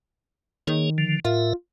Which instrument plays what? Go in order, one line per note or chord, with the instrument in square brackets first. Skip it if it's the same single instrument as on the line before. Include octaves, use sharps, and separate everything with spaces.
[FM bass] D#3 [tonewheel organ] A#3 G#4 C#5
[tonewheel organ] D3 F3
[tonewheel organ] A2 A#4 E5 [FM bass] F4